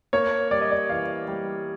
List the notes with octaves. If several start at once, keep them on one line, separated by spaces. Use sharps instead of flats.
A#3 C#5
G3 D5
D#5
D5
E3 F5
G3